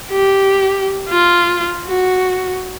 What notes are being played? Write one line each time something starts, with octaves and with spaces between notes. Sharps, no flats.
G4
F4
F#4